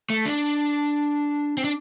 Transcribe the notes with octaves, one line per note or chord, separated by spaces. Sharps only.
A3
D4
C4
D4